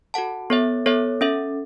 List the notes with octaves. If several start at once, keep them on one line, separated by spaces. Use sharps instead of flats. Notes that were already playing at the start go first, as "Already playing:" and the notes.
F#4 A4 F#5 A5
B3 A4 C#5 E5
B3 A4 C#5 E5
C#4 A4 E5